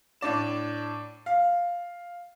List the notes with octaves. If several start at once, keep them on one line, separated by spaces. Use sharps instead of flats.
A2 D4 D5 E7
F5